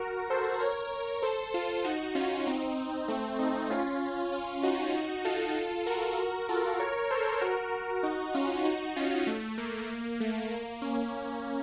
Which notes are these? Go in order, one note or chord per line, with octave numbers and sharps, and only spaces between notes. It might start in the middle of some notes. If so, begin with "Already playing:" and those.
Already playing: F#4 A#4
A4 C5
A#4 C#5
A4 C5
F4 A4
D#4 F#4
C#4 F4
C4 D#4
A3 C4
C4 D#4
C#4 F4
C#4 F4
D#4 F#4
F4 A4
F#4 A#4
F4 A4
A#4 C#5
A4 C5
F#4 A#4
D#4 F#4
C#4 F4
D#4 F#4
C#4 F4
A3
A#3
A3
A#3
A#3 C#4